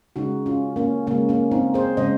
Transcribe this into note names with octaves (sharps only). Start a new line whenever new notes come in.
C#3 G#3 D#4 F#4
C#4 F4
A#3 C#4
C#3 G#3 A#3 C#4
A#3 C#4
C4 D#4
G#4 C5
C#3 G#3 C5 D#5